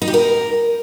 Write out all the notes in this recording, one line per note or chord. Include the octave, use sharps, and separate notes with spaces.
D#4
G4
A#4